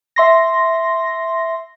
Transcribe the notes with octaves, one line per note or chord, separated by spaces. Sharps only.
E5 C6 A#6